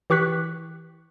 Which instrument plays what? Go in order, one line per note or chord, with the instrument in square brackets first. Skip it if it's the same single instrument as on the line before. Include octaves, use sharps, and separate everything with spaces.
[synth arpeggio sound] E3 G4 C#6 F#6 B6